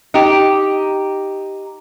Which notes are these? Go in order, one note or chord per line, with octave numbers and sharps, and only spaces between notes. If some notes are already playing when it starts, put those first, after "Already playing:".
D#4 G4